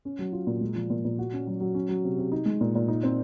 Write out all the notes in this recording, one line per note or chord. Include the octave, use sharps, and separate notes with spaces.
C#4
F#3
F4
A#2
G#3
F3
A#2
A#2
F#4
C#4
F#3
F#3
C#4
F#3
C3
C3
D#4
G#3
A#2
A#2
D#4
C4